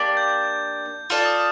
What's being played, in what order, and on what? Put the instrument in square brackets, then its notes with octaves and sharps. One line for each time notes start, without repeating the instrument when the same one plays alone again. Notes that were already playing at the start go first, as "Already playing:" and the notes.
Already playing: [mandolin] A#3 D4 G4 D5
[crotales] G6
[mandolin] F4 A4 D5 [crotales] F6
[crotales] D#6